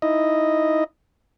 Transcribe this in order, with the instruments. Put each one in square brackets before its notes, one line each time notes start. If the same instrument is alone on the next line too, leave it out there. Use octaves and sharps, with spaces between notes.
[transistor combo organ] D#4 E4 D#5